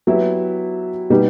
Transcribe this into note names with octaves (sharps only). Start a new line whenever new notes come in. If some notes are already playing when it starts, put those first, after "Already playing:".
F#3 B3 E4 G4
B2 G3 B3 D#4 G4